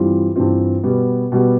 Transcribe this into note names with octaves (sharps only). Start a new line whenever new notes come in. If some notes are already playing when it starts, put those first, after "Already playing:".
Already playing: G2 E3 G3 C4 F4
G2 E3 G3 C4 F4
B2 G3 B3
B2 G3 B3